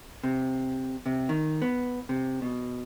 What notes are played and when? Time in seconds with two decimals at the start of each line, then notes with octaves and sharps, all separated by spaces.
0.23 C3
1.06 C3
1.29 D#3
1.62 B3
2.09 C3
2.42 B2